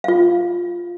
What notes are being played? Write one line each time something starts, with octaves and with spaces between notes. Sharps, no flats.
F4 F5